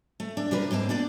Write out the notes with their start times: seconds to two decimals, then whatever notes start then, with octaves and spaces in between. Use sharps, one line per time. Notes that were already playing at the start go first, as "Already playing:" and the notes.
0.20 A3
0.37 D4
0.51 C3 D4 G4 A#4 B4
0.71 G#2 A#3 C4 A5
0.89 B3 D4 D5 G5